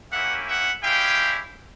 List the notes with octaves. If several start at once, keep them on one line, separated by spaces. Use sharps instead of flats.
A#3 C#4 E4 G4 E5 F#5
E5 F#5
G#3 C#4 E4 G4 F5 G5